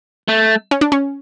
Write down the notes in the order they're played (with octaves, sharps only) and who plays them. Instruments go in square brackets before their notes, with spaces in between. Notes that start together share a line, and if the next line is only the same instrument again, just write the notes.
[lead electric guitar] A3
[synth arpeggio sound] C#4
D4
C#4